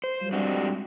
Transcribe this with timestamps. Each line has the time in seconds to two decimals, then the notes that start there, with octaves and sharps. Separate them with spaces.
0.04 C5
0.19 F#3 G3 F4
0.33 G2 G3 G#3 C4 D4 F#4